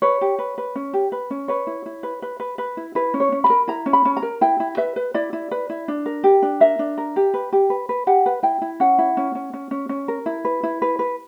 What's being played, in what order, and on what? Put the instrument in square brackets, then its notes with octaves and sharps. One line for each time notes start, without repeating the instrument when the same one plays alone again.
[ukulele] B4 C#5
G4
B4
B4
C#4
G4
B4
C#4
B4 C#5
E4
E4
B4
B4
B4
B4
E4
E4 B4
C#4
C#5
C#4
B5
A#4
E4 A#5
C#4
B5
C#4
A#5
A#4
E4 G5
E4
B4 E5
B4
E4 D5
E4
B4
E4
D4
A#4
G4
D4
A#4 E5
D4
A#4
G4
B4
G4
B4
B4
G4 F#5
B4
E4 G5
E4
C#4 F#5
E4
C#4
C#4
C#4
C#4
C#4
A#4
E4
B4
E4
B4
B4